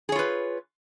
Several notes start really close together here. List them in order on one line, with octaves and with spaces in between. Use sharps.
G#4 C#5 F4 B4